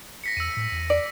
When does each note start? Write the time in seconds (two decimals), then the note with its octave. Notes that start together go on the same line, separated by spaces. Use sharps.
0.24 A#6 B6 C#7
0.37 E2 E6 D#7
0.57 A2
0.72 E2
0.90 D5